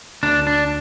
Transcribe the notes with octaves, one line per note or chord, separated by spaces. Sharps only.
D2 D4
D4